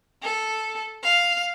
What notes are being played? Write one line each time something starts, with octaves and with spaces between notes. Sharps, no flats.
A4
F5